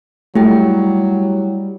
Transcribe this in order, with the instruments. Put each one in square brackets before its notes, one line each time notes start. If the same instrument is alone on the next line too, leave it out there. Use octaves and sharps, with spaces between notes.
[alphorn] F#3 [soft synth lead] G3 [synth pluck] A3 [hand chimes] E4 G4 G5